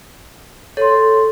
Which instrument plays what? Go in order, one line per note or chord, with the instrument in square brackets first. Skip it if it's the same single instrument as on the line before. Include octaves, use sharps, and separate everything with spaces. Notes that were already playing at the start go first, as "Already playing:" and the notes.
[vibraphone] A4 [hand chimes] C#5 C6